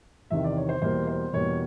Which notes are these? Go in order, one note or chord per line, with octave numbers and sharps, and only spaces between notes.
E2 C3 D#3 E5
D5
C#5
C5
E2 B2 G3 A#3 C5
C5
E2 B2 G3 A#3 C#5